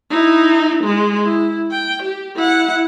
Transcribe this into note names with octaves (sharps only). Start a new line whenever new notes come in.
D#4 E4
G#3
E4
G5
G4
E4 F#5